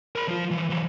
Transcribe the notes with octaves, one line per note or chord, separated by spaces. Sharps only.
A#4 B5
F3 F4
E3 F3
E3 F#3